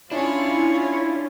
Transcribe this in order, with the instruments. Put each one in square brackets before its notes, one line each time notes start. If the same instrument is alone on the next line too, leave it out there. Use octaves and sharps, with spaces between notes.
[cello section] C#4 F4 [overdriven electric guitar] D4 [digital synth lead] E4 [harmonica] G#4 C#5